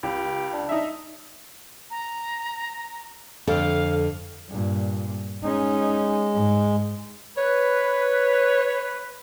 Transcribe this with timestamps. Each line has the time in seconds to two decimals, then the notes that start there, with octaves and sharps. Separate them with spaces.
0.03 C#2 G4
0.53 D4
0.69 D#4 E5
1.90 A#5
3.47 F2 D3 A4 F5
4.49 G2 A#2
5.43 G#3 C#4 D#4
6.34 G#2
7.37 B4 C#5